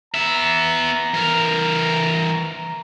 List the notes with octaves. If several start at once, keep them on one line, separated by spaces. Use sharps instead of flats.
B3 E5 A#5
E3 A#4